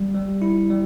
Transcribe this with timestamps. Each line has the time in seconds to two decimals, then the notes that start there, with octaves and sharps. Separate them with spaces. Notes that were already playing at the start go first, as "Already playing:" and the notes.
Already playing: G3
0.14 G3
0.42 E4
0.71 G3